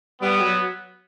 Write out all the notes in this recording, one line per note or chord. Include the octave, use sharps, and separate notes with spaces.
G3 B3
F#3